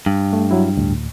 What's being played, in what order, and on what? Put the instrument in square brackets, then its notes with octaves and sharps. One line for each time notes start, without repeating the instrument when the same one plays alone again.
[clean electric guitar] G2
[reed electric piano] A3
F#3 E4
D2 A2